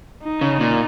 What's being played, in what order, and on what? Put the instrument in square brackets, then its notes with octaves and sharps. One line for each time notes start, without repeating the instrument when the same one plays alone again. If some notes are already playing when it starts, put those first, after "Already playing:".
[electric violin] D#4
[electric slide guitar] C#3
A#2